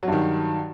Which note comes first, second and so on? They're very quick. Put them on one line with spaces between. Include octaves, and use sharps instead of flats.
F#3 G2 D#3